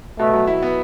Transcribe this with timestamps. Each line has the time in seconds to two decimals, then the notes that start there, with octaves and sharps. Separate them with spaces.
0.19 B2 A3
0.33 F#3
0.47 E4
0.62 B3